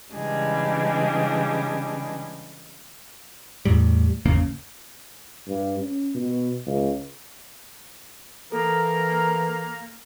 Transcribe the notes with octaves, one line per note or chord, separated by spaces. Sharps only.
C#3 E3 G3 G#3 D4
E2 A2 G3
G#1 E2 C#3 A#3
G2
C#4
B2
C#2
E3 A#3 A4 A#4